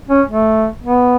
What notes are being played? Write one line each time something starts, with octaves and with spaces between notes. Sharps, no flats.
C#4
A3
B3